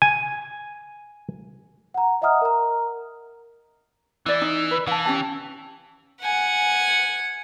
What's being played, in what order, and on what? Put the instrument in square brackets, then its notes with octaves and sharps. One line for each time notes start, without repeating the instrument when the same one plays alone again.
[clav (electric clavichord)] G#5
[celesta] F#5 A#5
D#5 E5 F#5 A#5 D#6 F6
A#4 A#5
[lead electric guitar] E3 [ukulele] E4 D5
[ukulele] D#4
B4
[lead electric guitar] E3 [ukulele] F5 A5
[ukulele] C#4 G4 A5
[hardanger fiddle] F#5 G#5